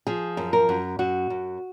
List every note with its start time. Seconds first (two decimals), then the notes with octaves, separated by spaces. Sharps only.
0.07 F3 G#4
0.37 F#2
0.53 A#4
0.69 F#2
0.99 F#2 F#4
1.30 F#2